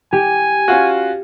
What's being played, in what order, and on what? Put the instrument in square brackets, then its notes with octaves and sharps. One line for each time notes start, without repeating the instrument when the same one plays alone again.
[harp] G4 [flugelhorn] G#5
[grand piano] C#4 F4 F#4